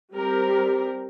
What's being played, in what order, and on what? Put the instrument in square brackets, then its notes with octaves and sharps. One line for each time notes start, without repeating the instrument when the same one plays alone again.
[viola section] G3 C4 G4 A#4